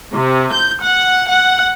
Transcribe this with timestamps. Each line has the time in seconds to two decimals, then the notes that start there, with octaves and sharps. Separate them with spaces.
0.14 C3
0.53 G6
0.82 F#5
1.29 F#5